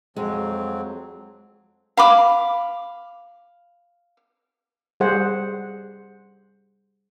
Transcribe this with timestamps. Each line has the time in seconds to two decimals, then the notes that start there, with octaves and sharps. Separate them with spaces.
0.16 F2 F#3 G#3 C4
1.97 F5 B5 D6
5.00 G3 G#4 C5 F#5